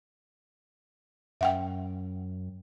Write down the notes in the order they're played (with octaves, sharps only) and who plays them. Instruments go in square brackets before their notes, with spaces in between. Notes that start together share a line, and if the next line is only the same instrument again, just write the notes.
[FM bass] F#2 [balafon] E5 F#5 G5